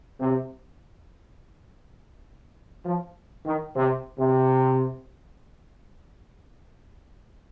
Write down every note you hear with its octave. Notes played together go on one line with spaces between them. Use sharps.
C3
F3
D#3
C3
C3